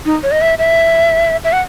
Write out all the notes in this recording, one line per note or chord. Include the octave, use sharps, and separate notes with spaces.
D#4
C#5
D#5
E5
E5
E5
F#5